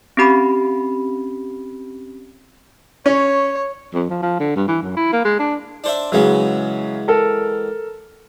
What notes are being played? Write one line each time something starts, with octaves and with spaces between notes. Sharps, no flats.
C4 C#4 G4 B5
C#4 C#5
F2
F3
F3
D3
G2
E3
F#2
E4
A#3
G#3
D4
D4 C5 E5
C#3 E3 F#3 G#3 B3
A4 A#4